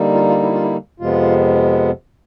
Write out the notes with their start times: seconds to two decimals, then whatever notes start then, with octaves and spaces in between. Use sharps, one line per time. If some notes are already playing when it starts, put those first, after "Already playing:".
Already playing: D3 G3 A#3 D#4
0.14 F4
0.29 F4
0.43 E4
0.53 F4
0.62 E4
1.00 F2 C3 F3 G#3 B3 F4